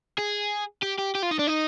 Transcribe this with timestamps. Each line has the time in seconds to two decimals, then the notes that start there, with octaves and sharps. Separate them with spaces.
0.19 G#4
0.83 G4
0.99 G4
1.15 G4
1.23 F4
1.31 D#4
1.39 D4
1.47 D#4